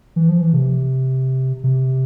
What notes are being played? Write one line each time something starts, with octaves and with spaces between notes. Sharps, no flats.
E3
F3
E3
C3
C3